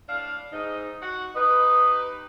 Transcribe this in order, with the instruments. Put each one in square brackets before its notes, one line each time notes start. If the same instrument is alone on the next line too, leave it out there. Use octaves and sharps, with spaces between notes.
[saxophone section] A2 D4 F5
G#2 D#4
F#4 F#5
[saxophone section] D#4 G4 B4 [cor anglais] D#5